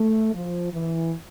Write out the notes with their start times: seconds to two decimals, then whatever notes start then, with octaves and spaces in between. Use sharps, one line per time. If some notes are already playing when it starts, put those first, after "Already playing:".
Already playing: A3
0.32 F3
0.71 E3